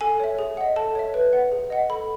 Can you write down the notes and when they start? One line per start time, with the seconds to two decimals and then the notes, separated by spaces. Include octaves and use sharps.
0.01 A4 G#5
0.20 C#5 E5
0.39 G#4
0.57 D#5 F#5
0.76 A4 A5
0.95 C#5 E5
1.14 B4
1.33 F#5
1.52 G#4
1.70 D#5 F#5
1.90 A4 B5